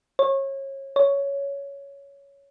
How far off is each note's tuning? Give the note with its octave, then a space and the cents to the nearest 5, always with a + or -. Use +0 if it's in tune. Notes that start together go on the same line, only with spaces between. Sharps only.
C#5 -30
C#5 +10